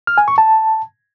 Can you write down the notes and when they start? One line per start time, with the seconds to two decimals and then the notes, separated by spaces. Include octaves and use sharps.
0.07 F6
0.18 G#5
0.28 C#6
0.38 A5